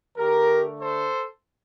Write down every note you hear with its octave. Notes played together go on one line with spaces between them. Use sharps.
D3 A3 D4 G4 A#4
A4 C5